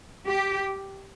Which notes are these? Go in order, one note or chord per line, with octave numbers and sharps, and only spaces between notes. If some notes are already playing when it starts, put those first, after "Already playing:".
G4